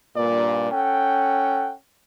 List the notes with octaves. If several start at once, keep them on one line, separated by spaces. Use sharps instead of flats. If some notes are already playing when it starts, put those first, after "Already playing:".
G2 A#2 D5
C#4 A4 F#5 G5